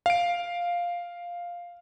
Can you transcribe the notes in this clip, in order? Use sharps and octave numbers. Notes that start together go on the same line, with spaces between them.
F5 D7